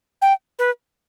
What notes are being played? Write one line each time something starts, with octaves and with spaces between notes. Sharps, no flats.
G5
B4